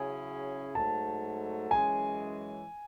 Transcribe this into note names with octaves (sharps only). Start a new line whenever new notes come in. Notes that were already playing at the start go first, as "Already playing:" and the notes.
Already playing: C#3 F#3 C#4 E4 G#4 G#5
G#2 F#3 A3 A5
F#2 E3 G#3 C#4 G#5